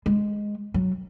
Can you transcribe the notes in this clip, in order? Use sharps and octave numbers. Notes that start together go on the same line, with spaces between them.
G#3
F#3